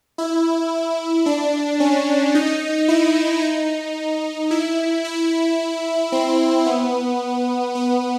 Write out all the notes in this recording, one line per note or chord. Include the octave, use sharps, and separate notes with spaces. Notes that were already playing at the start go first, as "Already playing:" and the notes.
E4
D4
C#4
D#4
E4
D#4
E4
E4
C4
B3
B3